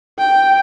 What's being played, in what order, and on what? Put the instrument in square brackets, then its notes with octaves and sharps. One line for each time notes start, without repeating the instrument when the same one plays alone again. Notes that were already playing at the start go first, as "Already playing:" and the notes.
[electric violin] G5